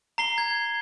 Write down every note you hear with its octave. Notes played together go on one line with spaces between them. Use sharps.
A#5 C7 G7
G#6